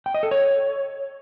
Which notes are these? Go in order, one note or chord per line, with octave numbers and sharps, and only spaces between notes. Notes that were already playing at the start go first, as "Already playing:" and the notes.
G5
D#5
A4
C#5